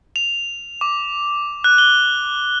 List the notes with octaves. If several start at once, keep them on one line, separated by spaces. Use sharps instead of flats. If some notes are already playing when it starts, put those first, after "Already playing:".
F7
D6
F#6
G7